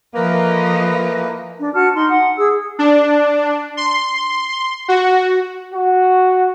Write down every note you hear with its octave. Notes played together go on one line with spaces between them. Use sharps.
E3 F3 A3 A#3 A#4 B4 D#5
D4
F#4 A5 F6
D#4 C6
F#5
G#4 E6
D4
C6
F#4
F#4